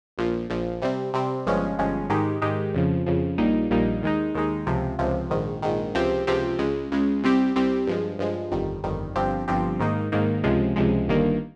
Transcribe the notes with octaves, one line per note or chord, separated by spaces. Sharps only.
A#1 A#2 F3
A#1 A#2 F3
C3 G3 C4
C3 G3 C4
G1 G2 F3 G#3 C#4
G1 G2 F3 G#3 C#4
G#2 D#3 G#3 D#4 G4
G#2 D#3 G#3 D#4 G4
F2 C#3 F3
F2 C#3 F3
A#1 A#2 G3 A#3 D#4
A#1 A#2 G3 A#3 D#4
D#2 D#3 G#3 D#4
D#2 D#3 G#3 D#4
C#2 C3 F3
C#2 C3 F3
A#1 G#2 D#3
A#1 G#2 D#3
C#2 C3 F3 C4 G4
C#2 C3 F3 C4 G4
C#2 C#3 G#3
C#2 C#3 G#3
C2 C3 G3 C4 G4
C2 C3 G3 C4 G4
G2 F3 G#3
G2 F3 G#3
G1 F2 D#3 G3
G1 F2 D#3 G3
G1 G2 F3 C4 G4
G1 G2 F3 C4 G4
G#2 D#3 A#3 D#4
G#2 D#3 A#3 D#4
C#2 C3 F3 G#3
C#2 C3 F3 G#3
G1 G2 D#3 A#3